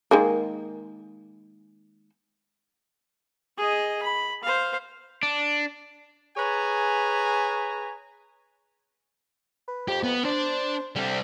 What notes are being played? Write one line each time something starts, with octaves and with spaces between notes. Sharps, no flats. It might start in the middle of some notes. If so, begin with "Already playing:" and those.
D#3 G#3 A#3
G#4 D#5
B5
C5 F5
D4
G#4 B4 C#5 G#5 A#5
B4
F2 G4
B3
D4 C5
D3 G3 C4